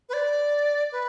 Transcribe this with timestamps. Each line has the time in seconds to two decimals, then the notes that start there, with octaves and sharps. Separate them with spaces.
0.09 B4
0.13 D5
0.92 B4